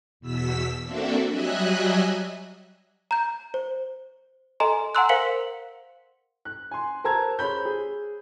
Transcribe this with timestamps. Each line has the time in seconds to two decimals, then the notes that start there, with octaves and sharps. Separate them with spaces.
0.20 E2 B2 E6 B6
0.83 A#3 C4 D4 F#4 A4 E5
1.28 F#3 G3 D#5 E5 G#5 F#6
3.11 A#5 G6
3.54 C5
4.60 A4 D#5 G#5 A#5 C6
4.95 F#5 G#5 A#5 C6 E6 F#6
5.09 A#4 C5 F5 B6 C#7 F#7
6.45 F#6
6.71 G#5 C6
7.04 A#4 C5 A5 A#5 E6 G#6
7.39 G#4 C5 C#5 B5 G6
7.65 G#4